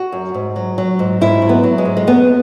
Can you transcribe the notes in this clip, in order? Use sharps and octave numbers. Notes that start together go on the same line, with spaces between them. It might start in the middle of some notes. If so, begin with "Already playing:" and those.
Already playing: F#4
F#2
G#2
F#3
F#3
G#2
G#2 E4
F#3
B3
F#3
G#3
G#2
G#3
F#2 B3